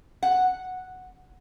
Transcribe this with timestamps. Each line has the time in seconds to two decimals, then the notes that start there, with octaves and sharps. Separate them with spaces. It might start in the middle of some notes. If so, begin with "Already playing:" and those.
0.23 F#5